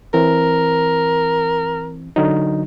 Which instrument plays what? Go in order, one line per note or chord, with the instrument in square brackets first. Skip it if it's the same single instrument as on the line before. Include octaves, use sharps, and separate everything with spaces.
[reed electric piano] E3 C4 [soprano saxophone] A#4
[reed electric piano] D3 F#3 D#4